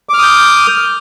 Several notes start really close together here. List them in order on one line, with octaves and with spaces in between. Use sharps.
D6 F6 D#6 G6